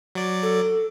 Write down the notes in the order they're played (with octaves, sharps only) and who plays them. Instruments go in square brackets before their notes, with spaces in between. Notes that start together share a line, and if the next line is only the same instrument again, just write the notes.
[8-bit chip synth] F#3 D5
[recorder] A4